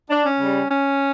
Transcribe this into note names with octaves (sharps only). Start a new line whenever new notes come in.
D4
C#4
C#3 G3
C#4